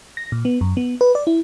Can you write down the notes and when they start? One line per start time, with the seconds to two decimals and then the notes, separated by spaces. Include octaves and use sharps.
0.17 A#6
0.32 A#2
0.45 B3
0.61 F#2
0.77 B3
1.01 B4
1.15 D5
1.27 E4